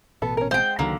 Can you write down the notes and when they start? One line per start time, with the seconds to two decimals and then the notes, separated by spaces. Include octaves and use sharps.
0.22 A1 B2 B3 A4
0.37 C#4 A#4
0.51 G#3 C4 C5 F5 G5
0.79 C#2 D3 D#3 F#3 A#3